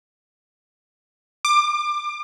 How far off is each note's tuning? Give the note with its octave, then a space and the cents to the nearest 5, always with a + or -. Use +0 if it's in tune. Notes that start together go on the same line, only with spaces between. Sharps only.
D6 +25